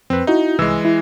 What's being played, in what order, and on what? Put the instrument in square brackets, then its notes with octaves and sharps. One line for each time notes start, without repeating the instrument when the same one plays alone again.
[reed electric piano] F2 [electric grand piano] C4 B4
[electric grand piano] D#4 [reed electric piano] E4 F#4
[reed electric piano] C2 E6 [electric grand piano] E3 G#3
[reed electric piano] E4